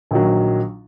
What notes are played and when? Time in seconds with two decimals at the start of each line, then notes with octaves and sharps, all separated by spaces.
0.11 A#1 D#3 F#3